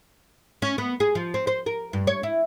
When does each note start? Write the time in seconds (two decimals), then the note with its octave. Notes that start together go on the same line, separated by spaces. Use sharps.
0.62 C#4
0.78 B3
1.00 G#4
1.15 F3
1.34 C4
1.47 C5
1.66 A#4
1.93 G2
2.07 C#5
2.23 E4